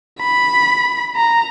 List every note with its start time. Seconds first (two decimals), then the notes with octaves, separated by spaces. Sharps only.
0.20 B5
1.16 A#5